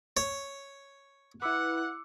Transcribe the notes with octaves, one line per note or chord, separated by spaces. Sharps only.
C#5
E4 B4 F#5 D6 E6 C#7